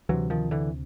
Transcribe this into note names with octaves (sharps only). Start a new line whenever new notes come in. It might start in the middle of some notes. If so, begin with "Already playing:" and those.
D2 C3 E3 F#3
D#3 F3
D3 E3